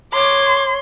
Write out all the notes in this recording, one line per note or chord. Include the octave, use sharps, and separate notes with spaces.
C#5 C6 D6